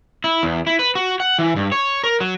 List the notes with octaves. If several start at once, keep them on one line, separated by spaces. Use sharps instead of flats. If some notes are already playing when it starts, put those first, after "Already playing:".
E4
E2
E4
B4
F#4
F#5
E3
G2
C#5
A#4
F#3